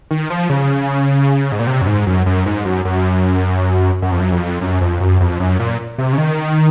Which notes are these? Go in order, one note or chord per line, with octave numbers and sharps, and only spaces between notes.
D#3
F3
C#3
G#2
A#2
C3
F#2
G#2
F#2
F#2
G#2
F#2
F#2
F#2
F2
F#2
F2
F#2
F2
F#2
F2
F#2
A#2
C3
C#3
D#3